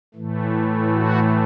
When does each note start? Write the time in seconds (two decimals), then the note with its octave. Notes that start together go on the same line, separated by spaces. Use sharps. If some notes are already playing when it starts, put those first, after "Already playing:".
0.15 A2 E3 A3
0.92 F#4